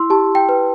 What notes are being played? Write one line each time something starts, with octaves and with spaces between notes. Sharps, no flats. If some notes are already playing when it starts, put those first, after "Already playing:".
Already playing: E4 C6 E6
G4 A5
G5
B4